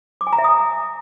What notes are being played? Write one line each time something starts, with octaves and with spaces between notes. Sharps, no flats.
D6
G#5
A#5
E5
D#6